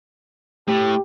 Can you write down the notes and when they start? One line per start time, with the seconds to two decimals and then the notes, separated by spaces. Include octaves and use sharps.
0.68 A2 G4